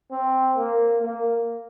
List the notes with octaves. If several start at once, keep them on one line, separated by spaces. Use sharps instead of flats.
C4
A#3
A#3